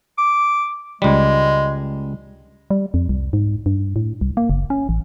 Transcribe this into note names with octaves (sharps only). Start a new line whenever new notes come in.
D6
C#2 G3 G#3
G3
F2
C2
G#2
G2
A2
C2
A#3
F#1
C#4
A1